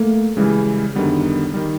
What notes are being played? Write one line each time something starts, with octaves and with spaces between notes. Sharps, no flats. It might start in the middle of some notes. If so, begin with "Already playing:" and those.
Already playing: A3 A#3
C#3 E3 G3 G#3
F#2 D3 D#3 G3 B3
D#3 G3